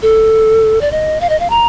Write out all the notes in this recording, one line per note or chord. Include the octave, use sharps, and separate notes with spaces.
A4
D5
D#5
F5
D#5
F5
A#5